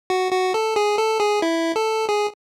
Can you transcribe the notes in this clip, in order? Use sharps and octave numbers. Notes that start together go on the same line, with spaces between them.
F#4
F#4
A4
G#4
A4
G#4
E4
A4
G#4